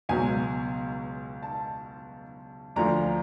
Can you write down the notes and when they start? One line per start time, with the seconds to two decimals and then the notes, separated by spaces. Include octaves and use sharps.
0.09 C#2 B2 F#3 G#5
1.43 A5
2.76 D2 D3 F3 A#5